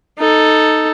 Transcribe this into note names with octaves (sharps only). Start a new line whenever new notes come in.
D#4 A4